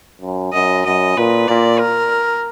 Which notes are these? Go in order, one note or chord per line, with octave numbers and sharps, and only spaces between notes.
F#2
F#2 D#5
F#2 D#5
A#2 B4
A#2 D5
A#4